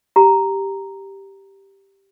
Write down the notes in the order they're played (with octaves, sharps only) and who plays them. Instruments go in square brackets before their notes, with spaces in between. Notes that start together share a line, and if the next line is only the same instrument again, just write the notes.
[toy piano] G4 A#5